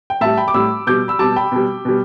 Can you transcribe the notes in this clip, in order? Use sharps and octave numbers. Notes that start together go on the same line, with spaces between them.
G5
A2 G3 E5 A5
G5 B5
D6
A2 G3 B5 E6
B2 G3 D6 G6
B5 E6
B2 G3 A5 D6
G5 B5
B2 G3
B2 G3